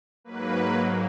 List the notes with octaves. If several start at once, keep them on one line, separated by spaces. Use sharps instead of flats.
G#2 F#3 A#3 B4